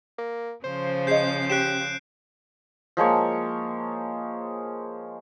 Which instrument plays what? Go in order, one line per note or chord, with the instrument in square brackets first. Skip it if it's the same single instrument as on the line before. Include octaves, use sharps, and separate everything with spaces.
[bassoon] A#3
[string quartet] C#3 F3 [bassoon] C5
[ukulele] G#4 D#5 [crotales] G6 C7
[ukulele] C#4 G4 [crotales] F#6 D7 E7
[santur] F3 G#3 A#3 C#5